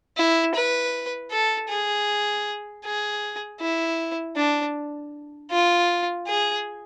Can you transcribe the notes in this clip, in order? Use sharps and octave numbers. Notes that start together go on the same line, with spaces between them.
E4
B4
A4
G#4
G#4
E4
D4
F4
G#4